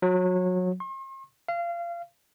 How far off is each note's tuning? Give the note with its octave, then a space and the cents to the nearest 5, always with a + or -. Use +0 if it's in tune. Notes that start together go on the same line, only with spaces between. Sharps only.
F#3 -25
C6 +45
F5 -25